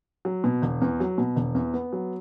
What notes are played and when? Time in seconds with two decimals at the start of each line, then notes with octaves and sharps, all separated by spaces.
0.25 F#3
0.44 B2
0.62 E1
0.82 E2
1.00 F#3
1.18 B2
1.36 E1
1.55 E2
1.74 B3
1.93 F#3